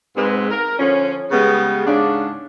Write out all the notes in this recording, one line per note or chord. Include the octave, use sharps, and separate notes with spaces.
G#2 B2 G#3 C4 B4
A#4
D3 F3 C#4
C#3 G3 G#3 B3
G#2 C#3 D4